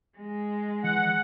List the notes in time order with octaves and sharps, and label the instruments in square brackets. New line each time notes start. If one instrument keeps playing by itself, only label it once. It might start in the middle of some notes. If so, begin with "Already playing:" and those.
[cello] G#3
[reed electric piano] E3 [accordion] F#5